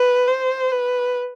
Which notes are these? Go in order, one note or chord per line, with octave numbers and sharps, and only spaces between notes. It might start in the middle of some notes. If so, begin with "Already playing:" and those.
Already playing: B4
C5
B4